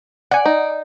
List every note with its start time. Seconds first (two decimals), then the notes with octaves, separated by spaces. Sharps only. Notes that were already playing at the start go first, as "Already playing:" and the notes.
0.31 D5 F#5 G#5
0.46 D#4